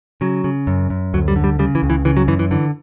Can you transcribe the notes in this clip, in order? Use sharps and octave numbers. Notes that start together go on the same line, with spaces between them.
C#3 F#3
C#3
F#2
F#2
D2 F#3
G3
D3
G3
C#3 G3
E3
C#2
E3
C#3 E3
F#3
F#2 E3
E3
D3 E3